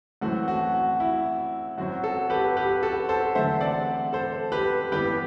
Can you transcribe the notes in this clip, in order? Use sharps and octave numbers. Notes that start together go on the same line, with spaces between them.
F#2 E3 A3 C4 F#4
F#4
F#4
E4
F#2 F#3 C4 F#4
F#4 A4
G4 B4
G4 B4
F#4 A4
A4 C5
E2 D3 F#3 A3 C4 C5 E5
D5 F#5
A4 C5
G4 B4
G2 E3 G3 B3 G4 B4